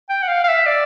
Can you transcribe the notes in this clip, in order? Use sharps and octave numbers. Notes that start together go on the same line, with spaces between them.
G5
F#5
F5
F5
E5
D5